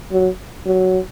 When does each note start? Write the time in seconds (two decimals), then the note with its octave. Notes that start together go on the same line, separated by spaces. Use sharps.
0.12 F#3
0.66 F#3